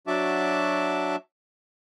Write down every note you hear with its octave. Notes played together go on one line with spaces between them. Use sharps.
F#3 D4 F#4 E5 A5 D6